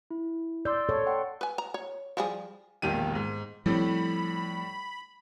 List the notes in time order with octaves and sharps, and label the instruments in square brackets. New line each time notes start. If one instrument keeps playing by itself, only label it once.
[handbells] E4
[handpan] D5 [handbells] C6 E6 G6
[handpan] A4 C#5
[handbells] F#5 G5 C6
[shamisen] B4 G#5
A#5
C#5
F3 G3 G#4
[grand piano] E1 A#1 D#3 G4 D#7
G#2
[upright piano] A2 [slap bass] F3 C4 [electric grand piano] G3 A4 [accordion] B5